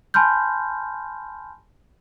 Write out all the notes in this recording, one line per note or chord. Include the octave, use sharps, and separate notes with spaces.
G#5 A5 B5 C6 F6 G6